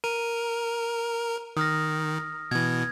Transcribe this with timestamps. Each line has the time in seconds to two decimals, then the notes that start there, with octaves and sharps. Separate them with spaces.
0.04 A#4 D#7
1.57 D#3 D#6 F6 A#6
2.51 B2 E3 G#6